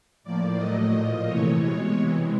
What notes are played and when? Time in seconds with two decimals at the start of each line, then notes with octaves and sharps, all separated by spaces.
0.24 A2 F3 A#3 D5
0.58 A2 F#3 A3 D#5
0.92 A#2 F3 A#3 D#5
1.27 C3 E3 A3 C#5
1.61 B2 G#3
1.96 C3 E3 G#3